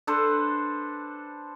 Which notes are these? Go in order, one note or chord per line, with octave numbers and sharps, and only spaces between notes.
D4 A4 B4 C5